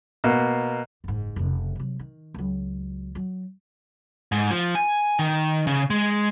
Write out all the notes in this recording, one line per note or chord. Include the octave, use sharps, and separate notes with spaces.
B2 A#3
F#1 G#2
F1 C#3
C3 F#3
D#3
C#2 F#3
F#3
G#2
F3
G#5
D#3
C#3
G#3